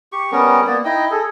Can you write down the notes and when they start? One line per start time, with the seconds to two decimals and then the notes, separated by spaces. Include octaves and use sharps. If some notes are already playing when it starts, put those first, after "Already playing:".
0.12 G4 C#6
0.32 G3 B3 C#4 A#4
0.67 A#3 B3 D5
0.85 D#4 E4 D#5 G5
1.11 G#4 A4